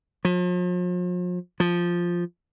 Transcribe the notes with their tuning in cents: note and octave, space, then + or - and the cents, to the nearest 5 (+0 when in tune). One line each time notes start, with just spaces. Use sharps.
F3 +40
F3 +0